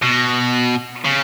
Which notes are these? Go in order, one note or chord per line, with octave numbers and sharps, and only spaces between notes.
B2
C#3